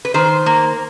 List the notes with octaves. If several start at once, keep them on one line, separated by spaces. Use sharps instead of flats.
B4
D#3 C5
A#3